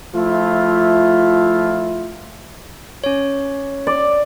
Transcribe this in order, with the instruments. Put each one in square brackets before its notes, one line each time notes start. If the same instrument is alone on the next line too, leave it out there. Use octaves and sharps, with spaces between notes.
[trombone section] F3 A3 E4 F4
[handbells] C#4 C#5
[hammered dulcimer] D5